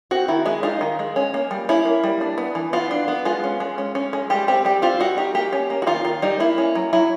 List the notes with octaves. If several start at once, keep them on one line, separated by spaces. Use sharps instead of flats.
C4 F#4
D#3 E4
G#3 E4
D#4 F4
D#3
G#3
C#4
A#3
G3
C#4 E4
A#3
G3
D4
B3
E3
B3 F4
D4
B3
G#3 F4
C#4
G#3
C#4
C#4
G#3
G3 G4
C4 G4
G3 G4
C4 F4
G3 F#4
D#4 G4
A#3 G4
C#4
A#3
F#4
D#3 F4
D#3 F4
G3 D#4
A#3 E4
C#4
F#3
F#3 E4